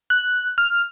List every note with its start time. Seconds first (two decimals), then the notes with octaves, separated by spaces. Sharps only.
0.10 F#6
0.58 F6